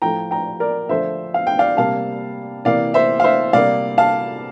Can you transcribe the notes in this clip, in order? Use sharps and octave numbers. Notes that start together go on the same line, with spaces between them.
A2 F3 A3 G5 A#5
G5 A#5
A#4 D5
D3 F3 A3 C5 E5
F5
G5
D5 F5
C3 G3 A#3 F5 A5
C3 E3 A#3 D5 F5
C5 E5
F5
C5 E5
C3 G3 A#3 D5 F5
F5 A5